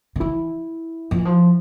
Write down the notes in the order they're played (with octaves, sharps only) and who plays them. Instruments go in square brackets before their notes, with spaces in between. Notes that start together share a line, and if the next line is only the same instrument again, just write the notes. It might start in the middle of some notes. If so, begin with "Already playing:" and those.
[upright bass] D3
[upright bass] E3 [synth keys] E4
[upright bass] F3
E3
F3